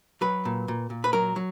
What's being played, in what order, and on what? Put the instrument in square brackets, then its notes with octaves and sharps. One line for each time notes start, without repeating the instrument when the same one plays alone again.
[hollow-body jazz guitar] F#3 B4
A#2
A#2
A#2
B4
F#3 A#4
F#3